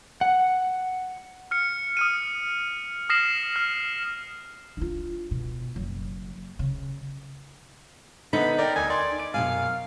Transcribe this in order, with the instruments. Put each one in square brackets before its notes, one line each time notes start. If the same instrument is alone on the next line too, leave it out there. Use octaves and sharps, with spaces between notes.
[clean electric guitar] F#5
[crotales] F6 C#7
D#6 F6 D#7
D#6 F6 A#6 C7 E7 F#7
F6
[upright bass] D4 F4
B2
F#1 F#3
C#3
[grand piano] D3 B3 [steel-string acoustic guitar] D#4 [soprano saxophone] B5
[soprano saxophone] A#4 [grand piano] D5 G5
[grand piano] D2 [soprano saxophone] G#5
[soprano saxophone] D5 [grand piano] C6
[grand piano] D7
[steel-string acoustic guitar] F#2 B2 G#5 [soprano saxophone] F5